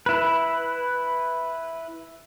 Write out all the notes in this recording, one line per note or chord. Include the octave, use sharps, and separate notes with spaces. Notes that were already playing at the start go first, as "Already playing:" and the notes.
E4 B4